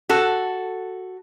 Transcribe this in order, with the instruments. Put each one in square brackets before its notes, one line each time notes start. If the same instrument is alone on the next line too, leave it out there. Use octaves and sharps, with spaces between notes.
[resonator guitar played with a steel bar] F#4 A4